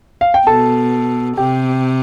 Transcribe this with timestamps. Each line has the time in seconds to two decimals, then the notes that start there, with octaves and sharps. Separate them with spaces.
0.21 F5
0.34 G5
0.47 B2 A4 A5
1.37 C3 G4 G5